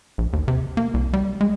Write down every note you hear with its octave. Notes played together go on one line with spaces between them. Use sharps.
A#1
D#2
C3
A#3
C2
G3
G#3